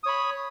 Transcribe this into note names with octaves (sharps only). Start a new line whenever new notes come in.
C#5 B5 D#6